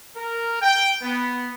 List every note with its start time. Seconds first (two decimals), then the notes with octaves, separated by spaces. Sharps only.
0.16 A#4
0.61 G5
1.02 B3